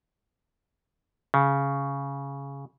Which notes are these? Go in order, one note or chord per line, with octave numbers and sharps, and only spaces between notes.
C#3